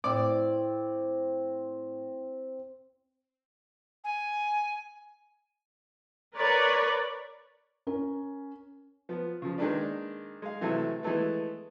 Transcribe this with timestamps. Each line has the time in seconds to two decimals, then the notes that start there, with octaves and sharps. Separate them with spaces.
0.04 A2 C4 D5
4.04 G#5
6.36 A#4 B4 C#5 D5
7.87 C#4 A#4
9.09 F3 B3
9.42 C#3 F3
9.58 D#3 G#3 A#3 D4 B4 D5
10.42 G#3 F5
10.61 C3 E3 F#3 A3
11.03 E3 G#3 A3 B3